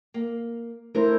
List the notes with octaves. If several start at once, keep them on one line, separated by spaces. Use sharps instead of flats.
A#3
A3 E4 A#4 C5